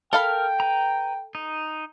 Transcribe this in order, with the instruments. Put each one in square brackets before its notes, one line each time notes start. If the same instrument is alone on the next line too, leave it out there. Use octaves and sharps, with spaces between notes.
[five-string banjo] A4 F5 B5 [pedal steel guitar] A#4 F6 [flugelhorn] G5
[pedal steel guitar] B4 A#5
D#4